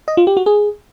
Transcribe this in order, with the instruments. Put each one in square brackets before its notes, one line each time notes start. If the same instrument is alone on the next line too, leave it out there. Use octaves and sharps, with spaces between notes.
[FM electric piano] D#5
F4
G4
F#4
G#4